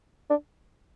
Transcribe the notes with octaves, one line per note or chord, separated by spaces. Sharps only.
D4